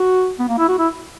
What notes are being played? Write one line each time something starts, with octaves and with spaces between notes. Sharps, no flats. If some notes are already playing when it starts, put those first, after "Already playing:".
Already playing: F#4
B3
A#3
E4
F#4
E4